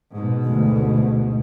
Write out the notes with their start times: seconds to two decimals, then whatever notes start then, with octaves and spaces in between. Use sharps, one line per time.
0.12 G#2 B2
0.45 D2